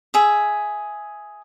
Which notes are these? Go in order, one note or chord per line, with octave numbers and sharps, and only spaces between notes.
G#4 E5